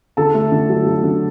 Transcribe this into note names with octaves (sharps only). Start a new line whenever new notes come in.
D3 A4 A5
A3
D3
F#3
F#3
D3